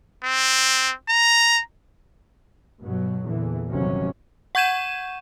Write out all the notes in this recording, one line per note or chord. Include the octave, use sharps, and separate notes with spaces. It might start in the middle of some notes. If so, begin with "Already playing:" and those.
C4
A#5
G2 B2 F#3
E2 A#2 D3 E3
G1 G2 C3 D#3 F#3 C#4
F#5 C#6 G6 G#6 D#7 E7